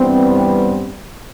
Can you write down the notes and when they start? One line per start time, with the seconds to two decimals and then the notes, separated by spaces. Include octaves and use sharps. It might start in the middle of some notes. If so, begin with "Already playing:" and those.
Already playing: G2 E3 G3 B3 C4
0.34 C4